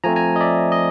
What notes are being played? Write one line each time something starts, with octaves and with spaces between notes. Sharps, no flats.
F3 A3 C4 G#5 A#5
G#5 A#5
D#5
D5 E5
D#5